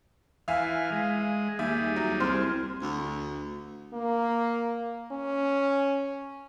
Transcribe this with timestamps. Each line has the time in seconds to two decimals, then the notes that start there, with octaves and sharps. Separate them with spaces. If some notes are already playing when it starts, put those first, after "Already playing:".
0.48 E3 E5 F5 G#5 F6
0.92 G#3
1.59 D#2 G3 G#4 E5 G#5
1.96 F#3
2.20 C2 C5 C6 F6
2.82 D2
3.94 A#3
5.12 C#4